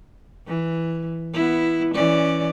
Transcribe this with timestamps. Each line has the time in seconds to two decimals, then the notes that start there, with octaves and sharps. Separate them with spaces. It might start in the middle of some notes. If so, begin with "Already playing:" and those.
0.47 E3
1.34 B3 E4
1.94 E3 C#4 D5